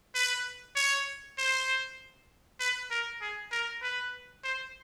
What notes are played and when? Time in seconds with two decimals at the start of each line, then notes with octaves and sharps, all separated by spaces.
0.14 B4
0.76 C#5
1.38 C5
2.60 B4
2.91 A#4
3.21 G#4
3.51 A#4
3.82 B4
4.44 C5